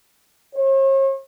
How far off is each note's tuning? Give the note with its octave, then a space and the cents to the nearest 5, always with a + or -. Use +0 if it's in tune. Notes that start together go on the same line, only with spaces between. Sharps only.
C#5 -45